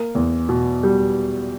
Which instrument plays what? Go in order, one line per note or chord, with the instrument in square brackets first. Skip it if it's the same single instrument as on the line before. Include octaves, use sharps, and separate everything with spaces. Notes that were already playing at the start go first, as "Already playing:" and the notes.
Already playing: [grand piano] A#3
E2
B2
G3